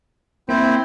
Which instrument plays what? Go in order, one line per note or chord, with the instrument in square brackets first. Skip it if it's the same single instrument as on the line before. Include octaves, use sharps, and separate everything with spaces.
[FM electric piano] A#3 [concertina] C4 E4 C5